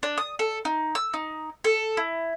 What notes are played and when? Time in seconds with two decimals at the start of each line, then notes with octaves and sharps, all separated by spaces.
0.03 D4
0.18 D#6
0.39 A4
0.65 D#4
0.95 E6
1.14 D#4
1.64 A4
1.97 E4